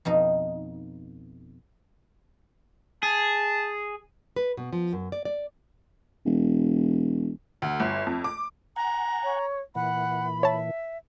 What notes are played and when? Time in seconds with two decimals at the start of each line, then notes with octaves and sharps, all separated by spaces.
0.05 F2 B2 D#4
3.03 G#4 A5
4.36 B4
4.57 B2
4.73 F3
4.93 F#2
5.12 D5
5.25 D5
6.26 E1
7.62 D2
7.80 G1
8.07 F2
8.24 D6
8.76 F#5 G#5 A#5
9.23 C#5
9.75 A#2 E3 F#5 B5
10.43 C#5 E5 A5